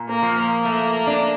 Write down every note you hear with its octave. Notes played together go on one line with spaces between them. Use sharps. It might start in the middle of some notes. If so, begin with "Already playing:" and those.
Already playing: A#2
A#3
F3
A#3
A3
D4